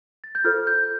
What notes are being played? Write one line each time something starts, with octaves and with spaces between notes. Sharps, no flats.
A6
G6
F4 A4 C5 F6
G6